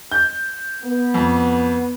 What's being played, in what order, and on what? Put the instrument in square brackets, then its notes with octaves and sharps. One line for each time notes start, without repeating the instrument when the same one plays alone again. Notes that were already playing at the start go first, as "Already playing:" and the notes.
[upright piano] G6
[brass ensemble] B3
[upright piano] F2